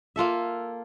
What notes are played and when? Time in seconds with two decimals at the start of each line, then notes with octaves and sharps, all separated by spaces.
0.16 A#3 F4 A4 E5